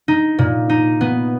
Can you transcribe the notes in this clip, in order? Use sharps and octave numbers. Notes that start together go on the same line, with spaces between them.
D#4
A#2
D#4
B3